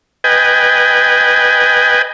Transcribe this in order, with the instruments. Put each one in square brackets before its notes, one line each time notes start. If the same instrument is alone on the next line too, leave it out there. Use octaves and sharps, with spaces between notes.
[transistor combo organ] B4 D#5 G5 G#5